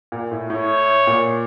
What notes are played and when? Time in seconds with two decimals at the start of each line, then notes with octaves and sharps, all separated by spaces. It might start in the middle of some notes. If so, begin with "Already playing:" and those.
0.12 A#2
0.32 A2
0.50 A2 C#5
1.07 A#2